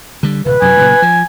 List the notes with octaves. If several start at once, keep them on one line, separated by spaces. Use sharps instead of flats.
D3 G3
D1 C3 B4
F#2 C3 F#3 G#5
A#2 C#3 F#3
F3